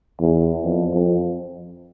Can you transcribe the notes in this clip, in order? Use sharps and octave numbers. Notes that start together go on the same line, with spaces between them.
E2
F2
F2